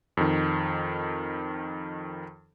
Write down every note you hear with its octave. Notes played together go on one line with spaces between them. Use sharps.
F2 D#3